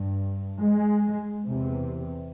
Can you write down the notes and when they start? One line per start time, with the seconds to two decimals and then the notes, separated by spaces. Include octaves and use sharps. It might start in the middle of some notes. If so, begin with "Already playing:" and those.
Already playing: G2
0.64 G#3
1.45 E2 C3